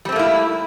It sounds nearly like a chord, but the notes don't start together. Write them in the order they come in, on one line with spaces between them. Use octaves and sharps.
G3 C4 A3 A#3 E4